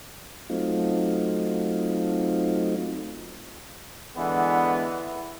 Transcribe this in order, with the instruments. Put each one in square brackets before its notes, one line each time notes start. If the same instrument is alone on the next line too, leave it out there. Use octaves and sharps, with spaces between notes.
[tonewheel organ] F#3 A3 C4 D#4 F4
[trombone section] D3 E3 G#3 B3